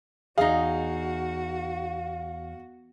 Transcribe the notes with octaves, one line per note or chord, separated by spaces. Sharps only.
E2 D#4 F#4 G#4 F5